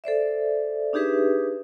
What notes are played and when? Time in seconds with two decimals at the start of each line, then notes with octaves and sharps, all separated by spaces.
0.04 A4 C5 D5 E5
0.93 D4 D#4 G4 G#4 B4 E5